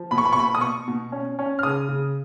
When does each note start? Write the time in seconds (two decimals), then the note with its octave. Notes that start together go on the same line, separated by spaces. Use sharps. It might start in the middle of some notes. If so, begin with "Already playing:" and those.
Already playing: F3
0.11 B2 B5
0.18 C#6
0.25 B5
0.33 C#6
0.36 B2 B5
0.55 D#6
0.61 B2 C#6
0.88 B2
1.12 C#4
1.39 C#4
1.59 F6
1.63 C#3 D#6
1.89 C#3